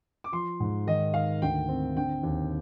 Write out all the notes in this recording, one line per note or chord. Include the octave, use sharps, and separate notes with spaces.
D6
F3 C6
G#2
D#3 D#5
D#3 F5
D2 G5
C4
D3 G5
D#2